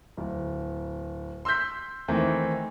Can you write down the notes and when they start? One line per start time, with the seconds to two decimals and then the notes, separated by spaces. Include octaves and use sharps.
0.17 D1
1.45 C6 E6 F#6 G6 B6
2.08 D#3 E3 A3 C4